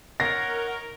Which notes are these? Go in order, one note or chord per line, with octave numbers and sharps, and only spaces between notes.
D#4 A#4 C#5 F#5 A#6